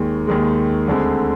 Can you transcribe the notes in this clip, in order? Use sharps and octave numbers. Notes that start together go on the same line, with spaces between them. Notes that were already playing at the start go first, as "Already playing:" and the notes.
Already playing: D#2 D#3 G#3
D#2 D#3 G#3
D2 D3 G#3 C4